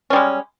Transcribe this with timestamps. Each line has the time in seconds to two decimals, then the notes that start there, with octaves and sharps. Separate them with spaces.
0.10 C#4
0.13 G3
0.16 G#3